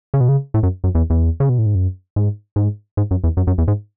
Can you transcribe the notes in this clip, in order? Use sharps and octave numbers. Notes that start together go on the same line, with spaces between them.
C#3
B2
C#3
A2
F#2
F#2
E2
E2
C#3
B2
A2
G#2
F#2
G#2
G#2
G#2
F#2
E2
F#2
F#2
E2
G#2